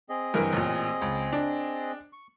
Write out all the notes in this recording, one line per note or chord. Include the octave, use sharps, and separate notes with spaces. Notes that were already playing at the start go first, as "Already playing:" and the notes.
C4 G#4 D#5
G2 E3 A#4
A1 A#2
C#2
D4
C#6